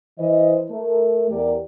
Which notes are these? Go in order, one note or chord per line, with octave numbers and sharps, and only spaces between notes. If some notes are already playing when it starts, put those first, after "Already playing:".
E3 C5 D#5
A3 A#4
E2 G4 A#4 D5